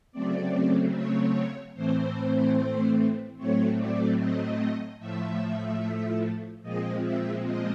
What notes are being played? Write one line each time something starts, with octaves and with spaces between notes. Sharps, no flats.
C#3 F#3 A3 C4 D5
C#5
A2 E3 A3 C4 C5
A2 F#3 A3 C4 C#5
D5
D#5
A2 F3 A3 E5
A#2 F3 G#3 C4 D#5
E5
D#5